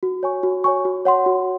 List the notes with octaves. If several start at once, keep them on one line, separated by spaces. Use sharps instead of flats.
F#4
C#5 G#5 C#6
F#4
C#5 G#5 C#6
F#4
C#5 F#5 C6
F#4